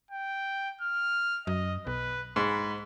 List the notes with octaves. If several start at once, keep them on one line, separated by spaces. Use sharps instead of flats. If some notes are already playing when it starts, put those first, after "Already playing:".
G5
F6
F#2 D#5
B1 B4
G#2 B5